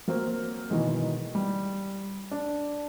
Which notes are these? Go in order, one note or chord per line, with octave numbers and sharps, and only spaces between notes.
F#3 A#3 C4
B2 D#3 E3 F#3 G#3
G3
D4